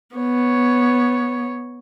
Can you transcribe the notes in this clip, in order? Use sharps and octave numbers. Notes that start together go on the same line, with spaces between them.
B3 C#5